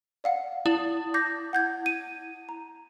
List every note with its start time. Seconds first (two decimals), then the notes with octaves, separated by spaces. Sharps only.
0.24 D5 F5 F#5
0.66 E4 E7
1.14 D6 G6 A#6
1.53 F#5 G6 G#6
1.86 D#7
2.49 A#5